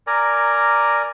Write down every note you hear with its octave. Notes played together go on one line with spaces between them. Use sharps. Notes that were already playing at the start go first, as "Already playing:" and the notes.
A#4 D5 G#5 A#5